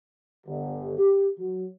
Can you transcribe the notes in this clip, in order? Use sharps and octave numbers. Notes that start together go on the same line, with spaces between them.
G1
G4
F#3